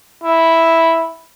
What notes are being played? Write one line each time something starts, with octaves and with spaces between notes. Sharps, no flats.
E4